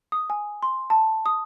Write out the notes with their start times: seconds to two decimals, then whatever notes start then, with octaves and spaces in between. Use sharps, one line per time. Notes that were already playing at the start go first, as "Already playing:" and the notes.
0.12 D#6
0.30 G#5
0.63 C6
0.90 A5
1.26 D#6